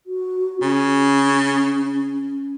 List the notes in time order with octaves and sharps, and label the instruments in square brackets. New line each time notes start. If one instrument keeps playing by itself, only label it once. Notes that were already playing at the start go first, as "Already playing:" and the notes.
[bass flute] F#4
[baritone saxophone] C#3 [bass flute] C#4